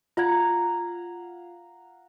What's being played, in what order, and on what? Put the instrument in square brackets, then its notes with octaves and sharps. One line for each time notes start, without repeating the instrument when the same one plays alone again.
[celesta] F4 G#6 [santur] F5 F#5 A#5